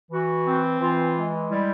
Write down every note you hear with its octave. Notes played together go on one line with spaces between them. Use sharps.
E3 F#4
C4
E3 F4
G#3
G3 E4